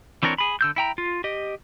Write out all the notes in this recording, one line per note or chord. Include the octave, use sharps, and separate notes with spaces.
E3 C4 D4 A#4 C#5
G#4 B5
D3 E6 G6
E4 G5 A#5
F4
G4 D#5